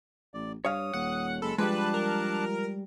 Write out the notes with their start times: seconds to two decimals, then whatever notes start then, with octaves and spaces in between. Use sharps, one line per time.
0.34 A1 D5
0.65 G2 C#5 F5 D#6
0.93 D#1 F#5
1.42 F#1 G#3 A4 B5
1.58 F3 G3 G#3 D4 B4 A5 F#6
1.94 A#4